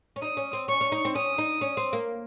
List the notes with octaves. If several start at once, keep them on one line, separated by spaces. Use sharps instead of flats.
C#4
D#4 D#6
C#4
C4
C#4 C#6
C#4
D#4
C4
C#4 D#6
D#4
C#4
C4
A#3